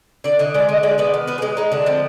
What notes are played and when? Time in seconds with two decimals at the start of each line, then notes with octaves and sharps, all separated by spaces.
0.24 D3 D5
0.39 D3 D#5
0.54 G#3 D5
0.69 D3 D#5
0.83 G#3 D5
0.98 B3 D5
1.14 D#3
1.27 B3 B4
1.38 G#4
1.42 G#3 G4
1.57 G#3 D#4
1.72 D3 D4
1.86 F3 C4